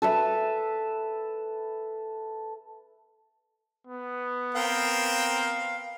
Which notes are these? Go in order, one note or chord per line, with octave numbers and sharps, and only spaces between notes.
A4 B4 E5
B3
C4 A#4 F5 G5